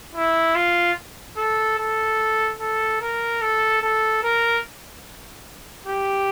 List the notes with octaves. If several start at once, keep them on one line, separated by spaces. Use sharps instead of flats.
E4
F4
A4
A4
A4
A#4
A4
A4
A#4
G4